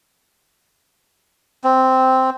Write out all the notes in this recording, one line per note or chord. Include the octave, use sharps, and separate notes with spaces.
C4